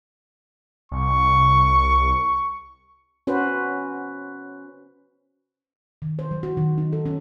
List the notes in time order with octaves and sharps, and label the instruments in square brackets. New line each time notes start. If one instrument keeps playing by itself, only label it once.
[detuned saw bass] C2 [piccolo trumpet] C#6
[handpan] C#4 F#4 B4 C5
D#3
C5
F#3
F#4
D#3
D#4
A4
C#4